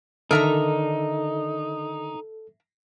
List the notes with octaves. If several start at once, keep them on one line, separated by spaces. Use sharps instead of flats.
D3 D#3 D#4 A4 A#4 E5 A#5